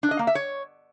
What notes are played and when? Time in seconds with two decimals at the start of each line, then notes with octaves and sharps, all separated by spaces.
0.03 D4
0.11 D#5
0.19 A#3
0.27 E5
0.35 C#5